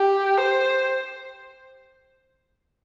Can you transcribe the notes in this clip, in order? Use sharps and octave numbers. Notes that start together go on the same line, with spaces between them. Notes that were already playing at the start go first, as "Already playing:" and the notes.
Already playing: G4
C5